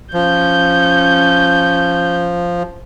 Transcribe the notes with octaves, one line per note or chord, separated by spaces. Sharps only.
F3 C#4 G6